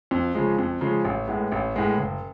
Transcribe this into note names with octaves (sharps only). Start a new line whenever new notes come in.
F2
C#3 F3 G#3
F2
C#3 F3 G#3
A1
A2 G#3 B3
A1
A2 G#3 B3
F#1